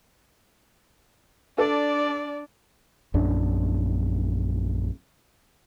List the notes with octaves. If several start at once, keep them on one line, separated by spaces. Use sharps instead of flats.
D4 A4 D5
A#1 F#2 D4